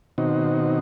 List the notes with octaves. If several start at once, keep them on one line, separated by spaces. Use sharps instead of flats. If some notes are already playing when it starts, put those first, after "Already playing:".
B2 D#3 C4 D#4 F#4